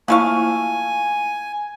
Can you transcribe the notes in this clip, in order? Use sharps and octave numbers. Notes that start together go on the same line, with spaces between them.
F3 A3 A#3 E4 F5 G#5 C#6